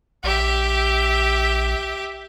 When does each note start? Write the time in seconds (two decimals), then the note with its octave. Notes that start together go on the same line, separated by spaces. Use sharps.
0.24 A#1 G4 E5